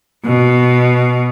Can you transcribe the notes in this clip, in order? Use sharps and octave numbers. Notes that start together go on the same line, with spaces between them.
B2